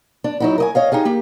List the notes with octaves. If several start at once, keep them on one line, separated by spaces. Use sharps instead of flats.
D4
F#3 D#4 E4
A#4 D#5 G#5
C#5 D#5 F5
D#4 G4 G#4 F5
A#3 G4